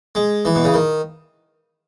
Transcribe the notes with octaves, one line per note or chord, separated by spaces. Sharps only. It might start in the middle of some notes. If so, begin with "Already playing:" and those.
G#3
E3
B2
C#3
D#3